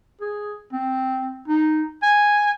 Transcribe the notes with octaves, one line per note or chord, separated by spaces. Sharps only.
G#4
C4
D#4
G#5